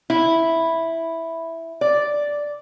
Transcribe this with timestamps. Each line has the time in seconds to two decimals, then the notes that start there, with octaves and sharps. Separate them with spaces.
0.10 E4
1.81 D5